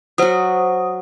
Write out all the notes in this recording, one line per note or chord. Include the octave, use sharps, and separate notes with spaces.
F#3 F#4 C5 D#6